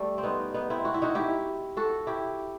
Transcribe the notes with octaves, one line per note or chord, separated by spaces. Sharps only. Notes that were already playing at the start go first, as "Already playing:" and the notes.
Already playing: G3 A3
C4
B3 D#4
B3 D#4
C4 E4
F#4
E4
D#4 F#4
E4 G4
F#4 A4
E4 G4